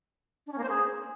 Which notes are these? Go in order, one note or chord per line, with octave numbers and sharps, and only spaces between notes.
D4
C#4
A#3
C5
G#4